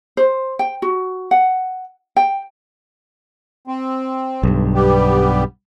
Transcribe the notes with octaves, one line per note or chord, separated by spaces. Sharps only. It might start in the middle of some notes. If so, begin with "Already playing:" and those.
C5
G5
F#4
F#5
G5
C4
B1 G2
G3 B3 G4